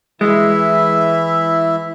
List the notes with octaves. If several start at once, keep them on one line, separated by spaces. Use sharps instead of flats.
E3 G#3 E4 E5